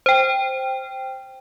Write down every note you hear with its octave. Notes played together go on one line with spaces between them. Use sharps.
C5 G5